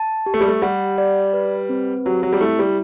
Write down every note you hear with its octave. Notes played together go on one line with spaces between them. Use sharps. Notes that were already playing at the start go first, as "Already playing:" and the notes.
Already playing: A5
G4
A3
G3
A3
G3 F#5
D5
B4
C4
F#3 G4
F#3
G3
A3 E4
G3